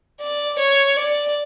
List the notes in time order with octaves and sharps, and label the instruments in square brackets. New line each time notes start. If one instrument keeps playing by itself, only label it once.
[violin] D5
C#5
D5